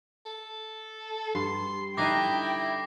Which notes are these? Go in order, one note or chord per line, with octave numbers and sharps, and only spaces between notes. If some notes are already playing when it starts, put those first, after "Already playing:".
A4
G2 C6
D3 D#4 E4 D#5 G5 D6 A#6 C7